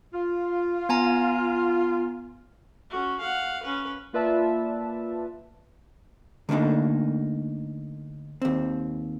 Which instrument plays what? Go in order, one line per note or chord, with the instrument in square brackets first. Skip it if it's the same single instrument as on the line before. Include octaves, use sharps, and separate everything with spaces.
[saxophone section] F4
[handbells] B3 G#5 A#5
[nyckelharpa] C#4 F#4
F5 F#5
C#4 B4
[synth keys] A#3 F4 B4 D5 E5 A5
[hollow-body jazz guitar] D3 A3 A#3 D4 D#4
D#2 C4